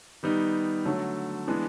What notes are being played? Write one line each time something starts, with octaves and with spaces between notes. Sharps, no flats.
D#3 G3 B3 D#4
D3 F#3 A3
E3 G#3 B3 D4